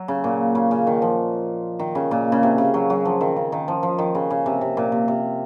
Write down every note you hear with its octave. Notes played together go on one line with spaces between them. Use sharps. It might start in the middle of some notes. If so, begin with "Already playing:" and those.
Already playing: F#3
C#3
A#2
C#3
C#3
D#3
F3
D#3
C#3
A#2
C#3
C3
C#3
F#3
F#3
F3
D#3
C#3
D#3
F3
F3
D#3
C#3
C#3
C3
C3
A#2
C3
C3